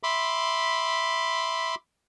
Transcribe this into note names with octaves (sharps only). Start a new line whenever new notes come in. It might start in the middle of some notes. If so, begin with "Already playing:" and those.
E5 B5 C6 D6